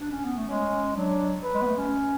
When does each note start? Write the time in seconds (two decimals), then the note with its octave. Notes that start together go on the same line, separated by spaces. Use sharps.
0.00 D4
0.12 C#4
0.25 B3
0.37 A3
0.49 G#3 C#4
0.96 F#3 D4
1.44 B4
1.54 G#3
1.62 B3
1.67 A3
1.78 C#4